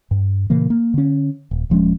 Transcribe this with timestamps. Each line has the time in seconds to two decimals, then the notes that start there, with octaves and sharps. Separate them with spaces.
0.11 G2
0.50 A#2 C#3 E3 A#3
0.70 A#3
0.94 D3 C#4
1.51 D#1
1.70 D#1 F3 G#3 C#4